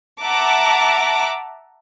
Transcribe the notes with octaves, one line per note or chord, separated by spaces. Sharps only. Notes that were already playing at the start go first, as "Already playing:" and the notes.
E5 F#5 A5 A#5 D6